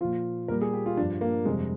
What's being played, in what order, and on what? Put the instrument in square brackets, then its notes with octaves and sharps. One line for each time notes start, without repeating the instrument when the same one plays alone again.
[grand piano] F3 F4
A#2
A#2 G3 A#4
G#4
G4
F4
F3 D4
G2
A#3
F2 C3 G3 G#3